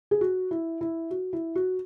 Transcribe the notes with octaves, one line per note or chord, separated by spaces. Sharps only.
G#4
F#4
E4
E4
F#4
E4
F#4